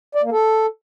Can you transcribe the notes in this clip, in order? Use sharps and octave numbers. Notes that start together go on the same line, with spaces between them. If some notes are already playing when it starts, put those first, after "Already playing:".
D5
A#3
A4